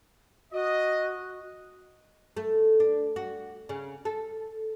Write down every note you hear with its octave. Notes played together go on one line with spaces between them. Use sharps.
F#4 D#5
A3
D4
F#4
C#3
A4